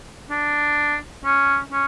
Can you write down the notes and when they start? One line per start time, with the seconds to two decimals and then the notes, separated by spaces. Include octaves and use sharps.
0.30 D4
1.25 C#4
1.72 C#4